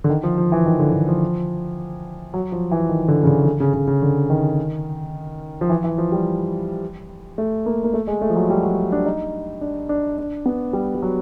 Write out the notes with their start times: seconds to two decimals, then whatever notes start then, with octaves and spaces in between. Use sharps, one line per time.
0.04 D3
0.10 D#3
0.23 F3
0.38 F3
0.52 E3
0.66 D#3
0.79 D3
0.93 D3
1.08 F3
2.34 F#3
2.52 F3
2.71 E3
2.89 D#3
3.08 D3
3.23 C#3
3.27 D3
3.45 D3
3.60 C#3
3.74 C#3
3.87 C#3
4.02 D3
4.30 D#3
5.61 F3
5.69 E3
5.84 E3
5.98 F3
6.12 G3
7.38 A3
7.66 A#3
7.84 A#3
7.94 A3
8.07 G#3
8.22 A3
8.30 F3
8.36 F#3
8.50 G3
8.63 F#3
8.92 D4
9.06 D#4
9.61 D4
9.89 D4
10.18 D4
10.46 B3
10.73 G3
10.95 G3
11.02 F#3